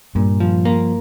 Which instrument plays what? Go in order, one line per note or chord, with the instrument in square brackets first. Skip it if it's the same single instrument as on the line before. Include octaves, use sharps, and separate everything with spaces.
[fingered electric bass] G2 [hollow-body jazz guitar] A#2
[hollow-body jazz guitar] F3
A#3